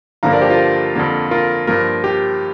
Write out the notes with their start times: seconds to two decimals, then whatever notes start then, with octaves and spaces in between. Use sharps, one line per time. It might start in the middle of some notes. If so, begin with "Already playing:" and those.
0.23 G2 D3 F3 A#3 F5 A#5
0.32 A#4 D5
0.41 G4 C5
0.50 F4 A#4
0.95 F2 D3 A#3
1.31 F4 A#4
1.67 G2 F3 A#3 F4 A#4
2.04 G4